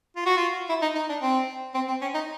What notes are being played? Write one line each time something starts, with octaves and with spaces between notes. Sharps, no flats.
F4
F#4
F4
E4
D#4
D#4
D4
C4
C4
C4
C#4
D#4